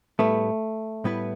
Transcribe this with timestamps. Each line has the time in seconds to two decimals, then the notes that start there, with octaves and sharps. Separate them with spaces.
0.19 A2 G3 A3 B3 E4 B4
1.04 A2 G3 B3 E4 B4